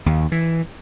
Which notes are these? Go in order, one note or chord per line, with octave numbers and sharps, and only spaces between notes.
D#2
E3